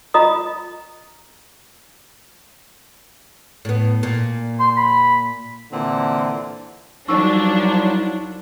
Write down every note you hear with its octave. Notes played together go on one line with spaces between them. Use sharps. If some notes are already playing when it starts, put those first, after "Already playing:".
F4 D#5 A#5 D#6
A2 B3
A#2
C6
B5
A#2 D3 E3 C4
C2 F3 F#3 D4 D#4 C#6 E6